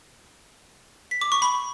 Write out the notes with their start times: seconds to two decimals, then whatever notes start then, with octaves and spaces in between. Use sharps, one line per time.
1.11 B6
1.21 D6
1.32 C#6
1.42 B5